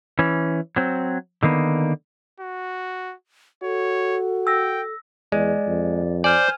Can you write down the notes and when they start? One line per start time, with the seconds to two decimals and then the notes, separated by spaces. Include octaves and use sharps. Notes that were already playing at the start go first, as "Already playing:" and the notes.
0.19 E3 C#4
0.76 F#3 C4
1.43 D3 D#3 A#3 B3
2.40 F#4
3.63 F#4 A4 C#5
4.47 G5 E6 A#6
5.32 E2 G#3 D5
5.68 F2
6.24 C5 D5 G#5 F6